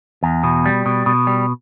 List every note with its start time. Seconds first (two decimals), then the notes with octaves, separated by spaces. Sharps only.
0.23 E2
0.43 B2
0.66 G3
0.86 B2
1.06 B2
1.27 G3